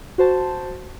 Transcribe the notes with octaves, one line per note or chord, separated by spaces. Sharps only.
F#4 C5 A5